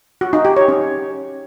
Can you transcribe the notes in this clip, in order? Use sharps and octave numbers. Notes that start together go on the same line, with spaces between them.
F#4
D#4
G4
C#5
C#4